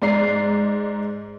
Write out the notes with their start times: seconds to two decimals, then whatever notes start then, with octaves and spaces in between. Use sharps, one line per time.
0.02 G#2 D5 A#5 C7